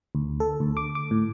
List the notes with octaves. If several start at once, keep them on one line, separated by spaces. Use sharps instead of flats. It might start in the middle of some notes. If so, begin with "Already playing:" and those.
D2
A4
D2
D6
D6
A2